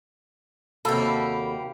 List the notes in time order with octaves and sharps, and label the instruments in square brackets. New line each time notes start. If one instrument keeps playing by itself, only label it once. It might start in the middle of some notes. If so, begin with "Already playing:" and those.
[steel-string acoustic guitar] D#2 C3 F#4 [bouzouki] A#3 G4 [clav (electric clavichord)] A4 [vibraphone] B5